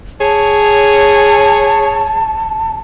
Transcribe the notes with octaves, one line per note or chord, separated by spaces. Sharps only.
G#4 C#5 A5